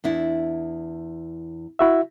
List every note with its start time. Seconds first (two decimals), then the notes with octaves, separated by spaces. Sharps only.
0.04 E2 D4 E4
1.79 E4 F#4 E5